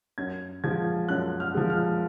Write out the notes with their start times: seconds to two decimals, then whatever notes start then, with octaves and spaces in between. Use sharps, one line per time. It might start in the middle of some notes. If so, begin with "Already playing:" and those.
0.18 F#2 G#6
0.64 F3 G#3 G#6
1.09 F#2 F#6
1.40 F6
1.55 F3 G#3
1.70 F6